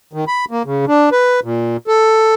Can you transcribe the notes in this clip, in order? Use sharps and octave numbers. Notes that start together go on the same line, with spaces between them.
D#3
B5
A#3
C#3
D4
B4
A#2
A4